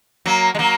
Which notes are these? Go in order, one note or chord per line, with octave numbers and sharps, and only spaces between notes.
F#3 A#3
G#3
F#3 A#3